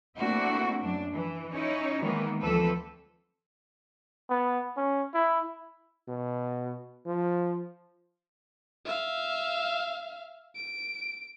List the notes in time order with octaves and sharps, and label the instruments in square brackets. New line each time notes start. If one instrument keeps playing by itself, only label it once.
[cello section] A3 A#3 C4 D4 E4 F#4
F#2 D4
E3
C#4 D#4 E4 C#5
D#3 E3 G#3 A#3 B3
D2 E3 F3 C4 A4 B4
[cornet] B3
C#4
E4
[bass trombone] B2
F3
[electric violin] E5 F5
D7